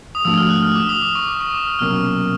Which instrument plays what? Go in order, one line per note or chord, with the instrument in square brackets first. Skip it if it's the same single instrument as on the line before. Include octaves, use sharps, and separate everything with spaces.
[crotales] D#6
[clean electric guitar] G#2 F3 A3 D4 F#4 [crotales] E6
[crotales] F6
F#6
F6
D6
D#6
D6
C#6
D6
C#6
D6
F6
[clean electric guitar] C2 B2 F#3 A#3 C#4 [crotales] F6